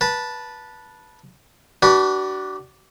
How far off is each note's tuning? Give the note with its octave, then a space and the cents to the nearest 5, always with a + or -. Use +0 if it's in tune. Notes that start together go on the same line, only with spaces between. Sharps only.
B4 -15 A5 +0
D4 +0 F#4 +40 B4 -10